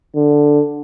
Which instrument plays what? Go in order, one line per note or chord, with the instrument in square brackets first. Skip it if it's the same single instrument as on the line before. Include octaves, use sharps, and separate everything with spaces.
[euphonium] D3